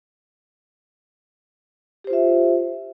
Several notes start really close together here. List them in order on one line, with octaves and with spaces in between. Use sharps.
G4 C5 F4 E5